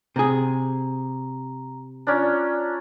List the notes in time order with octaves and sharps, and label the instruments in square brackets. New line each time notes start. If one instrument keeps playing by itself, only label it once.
[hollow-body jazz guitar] C3 G#4 [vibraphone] A#5
[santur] C#4 D4 [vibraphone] F4 D5 A#5